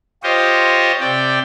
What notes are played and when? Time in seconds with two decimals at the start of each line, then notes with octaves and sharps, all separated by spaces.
0.23 F4 G4 C5 C#5 D#5
1.00 C3 D5 G5